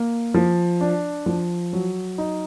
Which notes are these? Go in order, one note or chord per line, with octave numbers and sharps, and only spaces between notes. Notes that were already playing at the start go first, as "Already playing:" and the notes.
Already playing: A#3
F3
D4
F3
F#3
D#4